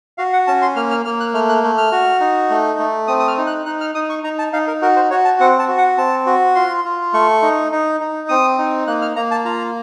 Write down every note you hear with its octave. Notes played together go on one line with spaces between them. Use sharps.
F#4 F5
F#5
C#4 A5
C6
A#3 F6
F6
A#3 F6
F#6
A3 F6
F#6
A3
F6
F#4
D#4
A3
A3
C4 D#6
D#6
F6
D#4
F#6
D#4 F#6
F6
D#4 D#6
C#6
D#4 A#5
A5
D#4 F5
A#4
F#4 A#4
C5
F#4 C#5
A5
C4 F#5
A5
F#4
F#5
C4 A5
F#4
F4 C6
F4
A3 C#6
D#4
D#4
D#4
C4 D#6
D#4
A#3 F#6
F6
A#3 A#5
A5
F4 A#5